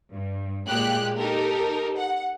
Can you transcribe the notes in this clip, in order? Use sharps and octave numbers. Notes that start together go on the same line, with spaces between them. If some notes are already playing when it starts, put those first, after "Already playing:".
G2
A#2 G#3 G4 F#6
D#4 G4 A4 A#4
F#5